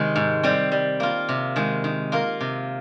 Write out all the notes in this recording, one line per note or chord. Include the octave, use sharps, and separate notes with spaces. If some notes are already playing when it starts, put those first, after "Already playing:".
Already playing: C3 D#3 G#3 C4
G#2
G3 C4
G3
A#3 F4
C3
D#3 G#3
D#3
A#3 F4 A#4
C3